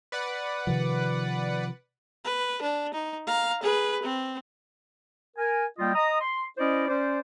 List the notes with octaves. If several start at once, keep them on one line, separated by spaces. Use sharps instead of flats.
B4 D5 F#5
C3 D#3 F3
B4
D4
D#4
F5 A#5
G#4 B4
C4
A#4 G#5
G3 A#3 F4 D#5 G5
D#5 A#5 D#6
C6
C#4 E4 C5 D5 D#5
C#4 C5 D5